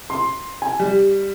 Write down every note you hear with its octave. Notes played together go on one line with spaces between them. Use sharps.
C6
G#5
G3